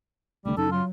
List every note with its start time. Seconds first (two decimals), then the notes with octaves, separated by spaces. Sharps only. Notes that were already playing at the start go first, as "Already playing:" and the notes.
0.45 C2 D3 G3 A3
0.57 F#2 C#3 D#4 A4
0.71 F#3 F4